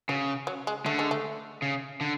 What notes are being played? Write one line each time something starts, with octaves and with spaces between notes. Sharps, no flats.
C#3 F#3
F#3
G#3
D3 A3
G#3
A3
C#3
D3